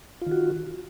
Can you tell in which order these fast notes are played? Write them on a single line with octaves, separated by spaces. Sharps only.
F4 D#3 F#4